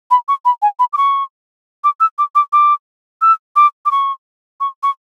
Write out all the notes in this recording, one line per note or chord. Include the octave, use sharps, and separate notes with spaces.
B5
C#6
B5
G#5
B5
D6
C#6
D6
E6
D6
D6
D6
E6
D6
D6
C#6
C#6
C#6